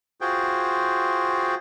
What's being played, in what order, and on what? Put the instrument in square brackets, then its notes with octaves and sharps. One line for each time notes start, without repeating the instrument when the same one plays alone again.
[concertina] F4 F#4 G#4 C5 G5